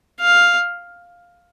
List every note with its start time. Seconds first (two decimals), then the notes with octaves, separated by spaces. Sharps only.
0.20 F5